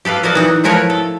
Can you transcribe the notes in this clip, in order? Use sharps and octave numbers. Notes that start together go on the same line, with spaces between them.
G4 A4 B4 F5
E4 F#4 A#4 D5 D#5
E3 D#4 F#5
F3 A3 E4 A#4 B4 C#5
A4